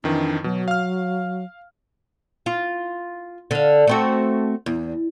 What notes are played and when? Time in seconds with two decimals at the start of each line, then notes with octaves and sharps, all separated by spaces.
0.04 F2 D#3 E3 D4
0.44 B2 F#3
0.68 F5 F6
2.46 F4
3.51 D3 F5
3.87 A3 C4 F#4
4.66 E2